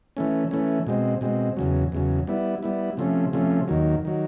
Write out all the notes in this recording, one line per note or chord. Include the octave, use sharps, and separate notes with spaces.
E3 A3 C#4
E3 A3 C#4
B2 G#3 C4
B2 G#3 C4
E2 C#3 F#3
E2 C#3 F#3
G3 B3 E4
G3 B3 E4
C3 F3 A3 C#4
C3 F3 A3 C#4
D#2 D#3 F#3
D#3 F#3